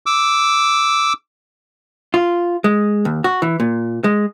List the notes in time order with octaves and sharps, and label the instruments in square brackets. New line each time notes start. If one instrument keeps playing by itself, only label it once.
[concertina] D6 E6
[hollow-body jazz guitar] F4
G#3
D#2
F#4
E3
A#2
G#3